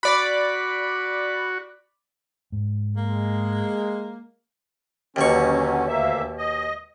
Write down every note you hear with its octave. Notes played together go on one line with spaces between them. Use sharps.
F#4 D5 B5
G#2
G#3 A#3
D#2 B2 D3 F#3 C#4 C#6
D2 A#3 E5
D#5